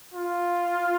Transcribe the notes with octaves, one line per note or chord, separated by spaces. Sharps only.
F4